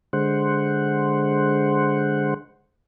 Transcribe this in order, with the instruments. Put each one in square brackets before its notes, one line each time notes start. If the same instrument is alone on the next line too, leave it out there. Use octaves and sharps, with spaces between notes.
[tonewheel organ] D3 G#3 C5 F#5